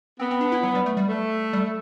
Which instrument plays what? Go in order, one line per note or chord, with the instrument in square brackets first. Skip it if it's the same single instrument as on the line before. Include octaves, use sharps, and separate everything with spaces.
[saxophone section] B3 [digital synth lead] C4
[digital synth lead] C4
D4
E4
F#3
G3
A3
G3
[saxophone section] A3
[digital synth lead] G3